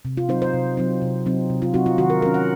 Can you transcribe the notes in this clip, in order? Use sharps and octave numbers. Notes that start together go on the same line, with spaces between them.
C3
F4
F#3 C4 D#4 C5
C5
C3
F#3 C4 D#4
C3
F#3 C4 D#4
C3
F4
F#3 C4 D#4 F#4
F4
D#3 F#4
A#4
F#3 C#4 A#4
F#5